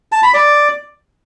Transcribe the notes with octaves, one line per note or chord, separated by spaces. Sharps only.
A5
B5
D5